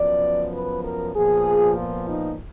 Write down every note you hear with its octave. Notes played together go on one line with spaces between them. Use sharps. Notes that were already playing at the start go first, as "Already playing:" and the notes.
Already playing: F#2 F3 B3 D5
B4
A#4
A#2 F3 B3 G#4
F4
D#4